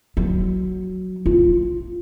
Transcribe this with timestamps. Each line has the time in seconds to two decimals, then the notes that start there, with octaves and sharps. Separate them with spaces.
0.17 F#3
1.26 F4